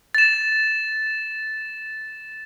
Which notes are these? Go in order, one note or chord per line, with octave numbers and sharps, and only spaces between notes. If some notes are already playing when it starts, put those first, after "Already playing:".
A6 E7